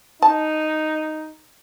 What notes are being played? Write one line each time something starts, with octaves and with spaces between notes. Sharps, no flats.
D#4 A5